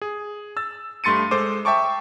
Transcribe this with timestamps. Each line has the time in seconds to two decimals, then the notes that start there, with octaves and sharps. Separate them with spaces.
0.02 G#4
0.57 E6 A6
1.04 G2 A3 C6 A6 C#7 D#7
1.31 G#3 A4 C5 D6
1.65 E5 G5 A5 C#6 D6